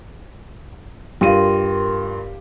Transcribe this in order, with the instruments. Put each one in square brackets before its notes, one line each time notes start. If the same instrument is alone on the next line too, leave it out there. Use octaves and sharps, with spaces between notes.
[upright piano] G2 F4 D#7 [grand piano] G4 F5 [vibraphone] A#4 C6